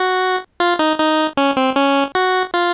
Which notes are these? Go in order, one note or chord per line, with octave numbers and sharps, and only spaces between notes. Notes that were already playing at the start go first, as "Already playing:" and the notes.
Already playing: F#4
F4
D#4
D#4
C#4
C4
C#4
F#4
F4